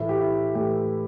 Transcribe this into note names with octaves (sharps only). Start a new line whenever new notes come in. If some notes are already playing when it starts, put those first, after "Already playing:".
Already playing: A2 E3 A3 E4
G4
E4
A2 E3 A3 G4